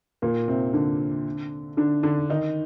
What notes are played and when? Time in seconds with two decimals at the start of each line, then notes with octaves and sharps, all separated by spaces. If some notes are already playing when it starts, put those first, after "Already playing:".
0.22 A#2 A#3
0.48 C3 C4
0.74 D3 D4
1.77 D3 D4
2.03 D3 D4
2.30 D#3 D#4